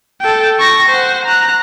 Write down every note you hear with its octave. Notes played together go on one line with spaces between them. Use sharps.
A4 G5
C#6 A#6
C5 F#5
A#5 F#6